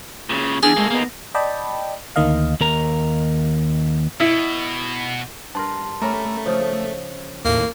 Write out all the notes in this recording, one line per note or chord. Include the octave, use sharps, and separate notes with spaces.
A#2 C#3
E2 D4 G#4
G#3 A#3 A4
A#3 B3 D#4
D5 D#5 G5 A5 B5
D2 D#3 A#3 D#5 F5
D#2 A#4 A#5
B2 E4
G2 A#4 A5 C6
A3 C#4 A#4 D5 A#5 B5
C#3 F3 D#4 C#5
D#2 A2 A#3